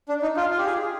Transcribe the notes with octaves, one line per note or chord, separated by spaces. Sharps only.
D4
D#4
F4
F4
G4
G#4